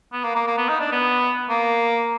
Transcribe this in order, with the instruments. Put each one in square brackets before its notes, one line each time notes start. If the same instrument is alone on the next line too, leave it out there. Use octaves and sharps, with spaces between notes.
[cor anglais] B3
A#3
A#3
A#3
B3
D#4
D4
B3
A#3